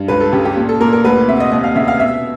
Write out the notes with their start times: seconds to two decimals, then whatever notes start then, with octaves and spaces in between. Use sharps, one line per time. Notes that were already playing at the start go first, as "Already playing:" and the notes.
Already playing: G2
0.08 C#2 B4
0.20 A4
0.33 C#3 G4
0.45 G4
0.57 A#2
0.69 A4
0.81 A#2 A#4
0.93 A#4
1.04 D2 B4
1.28 C3 E5
1.40 D#5
1.52 D#2 D#5
1.64 F5
1.76 C#3 E5
1.88 F5
2.00 B2 E5